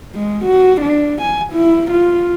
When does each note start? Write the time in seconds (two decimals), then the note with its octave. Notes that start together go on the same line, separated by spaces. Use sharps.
0.15 G#3
0.45 F#4
0.81 D4
1.21 G#5
1.53 E4
1.91 F4